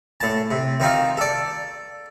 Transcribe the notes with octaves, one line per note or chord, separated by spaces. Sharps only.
A2 A5
C3
D#3 C4 D#4 F4
A4 D5